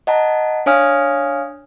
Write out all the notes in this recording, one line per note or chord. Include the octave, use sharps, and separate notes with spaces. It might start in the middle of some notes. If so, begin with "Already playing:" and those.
D#5 F#5 A5 A#5
D4 C#5 F5 G#5 D#6 F6